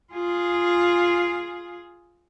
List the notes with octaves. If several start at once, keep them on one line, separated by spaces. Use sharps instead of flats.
F4 G#4